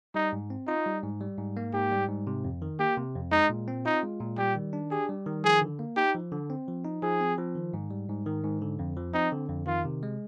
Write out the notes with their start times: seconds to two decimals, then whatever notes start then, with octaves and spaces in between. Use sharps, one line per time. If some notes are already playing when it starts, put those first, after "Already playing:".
0.15 G3 D#4
0.33 G#2
0.50 C4
0.67 D#4 F4
0.86 G3
1.03 G#2
1.21 G3
1.38 G#2
1.57 A#3
1.73 G#2 G4
1.92 G3
2.09 G#2
2.27 C3
2.44 F2
2.62 D#3
2.79 A#3 G4
2.97 C3
3.15 F2
3.32 G#3 D#4
3.50 A#2
3.68 C4
3.85 D#4 F4
4.03 G#3
4.20 A#2
4.38 G3 G4
4.56 D#3
4.73 D4
4.91 G4 G#4
5.09 G3
5.26 D#3
5.44 F3 G#4
5.62 D3
5.79 A#3
5.97 D#4 G4
6.15 F3
6.32 D3
6.50 C4
6.68 F3
6.85 D#4
7.02 F3 G#4
7.20 C4
7.38 F3
7.55 D#3
7.74 G#2
7.91 G3
8.09 G#2
8.26 D#3
8.44 G#2
8.62 D3
8.79 F2
8.97 F3
9.14 C4 D#4
9.32 D3
9.49 F2
9.67 D#3 F4
9.85 C3
10.03 G#3